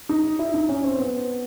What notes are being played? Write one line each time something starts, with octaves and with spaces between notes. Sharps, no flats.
D#4
E4
D#4
C#4
C4
B3